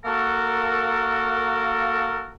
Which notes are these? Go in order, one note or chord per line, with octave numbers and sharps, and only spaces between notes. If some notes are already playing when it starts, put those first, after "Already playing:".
A#3 F#4 A4 A#4